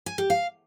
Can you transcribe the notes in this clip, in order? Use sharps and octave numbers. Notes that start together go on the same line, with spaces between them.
G#5
G4
F5